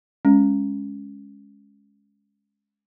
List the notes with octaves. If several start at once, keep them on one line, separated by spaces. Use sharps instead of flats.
G#3 C#4